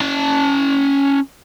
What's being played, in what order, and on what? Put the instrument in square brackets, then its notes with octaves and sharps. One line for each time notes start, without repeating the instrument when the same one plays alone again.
[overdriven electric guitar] C#4 A5